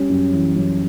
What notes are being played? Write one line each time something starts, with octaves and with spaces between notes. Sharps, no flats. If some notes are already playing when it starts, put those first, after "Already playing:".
Already playing: G3 C#4
F#2
E3
F#2